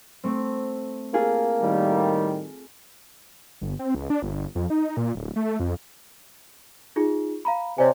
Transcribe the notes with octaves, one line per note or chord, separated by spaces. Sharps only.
A3 C4
A#3 F4 G#4 A4
A2 D#3 G3
G1
C4
C#2
D4
G1
F2
D#4
A#2
D1
A3
F2
D#4 F4 G#4
F5 A#5 B5
C3 C#5 D5 G#5